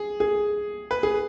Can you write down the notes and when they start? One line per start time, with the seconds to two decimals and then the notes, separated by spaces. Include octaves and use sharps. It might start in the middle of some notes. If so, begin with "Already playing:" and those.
Already playing: G#4
0.20 G#4
0.91 B4
1.03 G#4